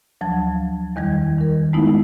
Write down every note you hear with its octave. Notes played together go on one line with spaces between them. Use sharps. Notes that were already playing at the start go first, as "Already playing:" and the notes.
D2 F3 F#3 A5 G#6
E2 D#3 G3 G#6
D#3 A#4
G#3 A3 B3 D#4 E4